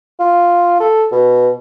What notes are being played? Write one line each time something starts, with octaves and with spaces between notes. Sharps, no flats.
F4
A4
B2